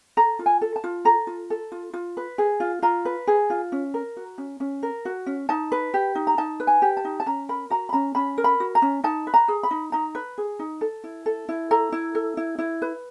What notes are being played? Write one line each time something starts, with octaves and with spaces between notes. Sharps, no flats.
A4 A#5
F4
G#5
A4
A5
F4
A4 A#5
F4
A4
F4
F4
B4
G#4
F4
F4 A#5
B4
G#4
F4
C#4
A#4
F#4
C#4
C#4
A#4
F#4
C#4
D#4 A5
B4
G4
D#4
A#5
D#4 A5
B4
G#5
G4
A5
D#4
A5
C#4 A#5
A#4 B5
F#4 A#5
B5
C#4 A#5
C#4 B5
A#4
B5
F#4
A#5
C#4
D#4 A5
B4
A#5
G#4
B5
D#4
D#4 A#5
B4
G#4
D#4
A4
E4
A4
E4
A4 A#5
E4
A4
E4
E4
B4